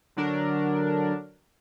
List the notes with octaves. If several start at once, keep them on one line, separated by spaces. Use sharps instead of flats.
D3 F#3 D4 A#4